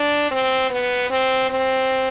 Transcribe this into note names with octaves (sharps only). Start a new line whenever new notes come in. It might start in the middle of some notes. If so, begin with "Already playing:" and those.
Already playing: D4
C4
B3
C4
C4